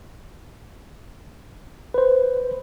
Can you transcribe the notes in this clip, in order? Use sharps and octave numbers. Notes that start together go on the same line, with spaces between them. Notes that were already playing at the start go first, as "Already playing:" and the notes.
B4 C5